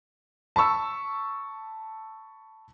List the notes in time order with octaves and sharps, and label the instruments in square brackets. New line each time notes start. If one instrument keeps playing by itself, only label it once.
[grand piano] A5 B5 C#6 E6